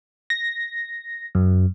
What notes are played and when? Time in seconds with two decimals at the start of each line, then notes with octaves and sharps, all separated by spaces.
0.30 A#6
1.35 F#2